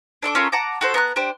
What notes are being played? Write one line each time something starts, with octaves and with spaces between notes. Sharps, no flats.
D4 A4 C#6 D6
C#4 F4 A4 A#4
F#5 A5 A#5 D6
F#4 A4 C5
B3 A#5 C6 F#6
D4 G4 C5